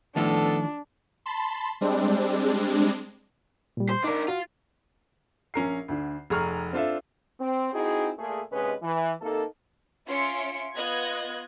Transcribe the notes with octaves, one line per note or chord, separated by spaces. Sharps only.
A2 D#3 F3 A3 B3 D4 A4
A5 B5 C6
G3 G#3 C4 D4
A#2 G3
C5
D4 D#4 A#4 D5
F4 F#4
A#1 C#4 A#4 C7
D2 D3
F1 G#4 A#5 C#6 F6
C4 D4 F4 A4 E5
C4
C4 D#4 E4 F#4 G#4
A#2 A3 G#4
D#2 C3 G#3 C#4 B4 D#5
E3
C3 A#3 D#4 A4
C#4 F4 E5 C6 C#7 D7
B3 F4 D#5 F#6 G#6